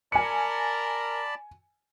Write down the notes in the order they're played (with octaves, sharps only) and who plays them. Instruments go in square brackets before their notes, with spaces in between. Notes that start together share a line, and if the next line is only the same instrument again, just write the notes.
[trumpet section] A#4 [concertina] D5 A5 B5 [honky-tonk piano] G#5 C#7